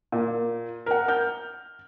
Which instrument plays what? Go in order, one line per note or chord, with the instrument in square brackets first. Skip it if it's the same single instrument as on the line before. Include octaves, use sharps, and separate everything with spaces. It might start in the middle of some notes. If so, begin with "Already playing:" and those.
[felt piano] A#2
A#4 F#5
F6 G6